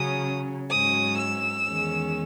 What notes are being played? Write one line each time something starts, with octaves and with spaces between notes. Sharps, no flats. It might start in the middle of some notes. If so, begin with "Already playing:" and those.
Already playing: C#3 F#3 C#4 D#6
G#2 F#3 C#4 D#6
E6
E2 D#3 G#3 C#4